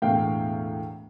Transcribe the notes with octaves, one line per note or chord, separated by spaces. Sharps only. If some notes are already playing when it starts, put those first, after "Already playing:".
E1 E2 A2 F5 G5